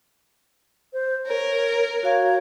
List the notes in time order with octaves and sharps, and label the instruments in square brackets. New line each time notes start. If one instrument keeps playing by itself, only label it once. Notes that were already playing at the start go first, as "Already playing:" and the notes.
[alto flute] C5
[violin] A#4 [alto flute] C#5
[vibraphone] F#4 F5 A#5 [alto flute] C#5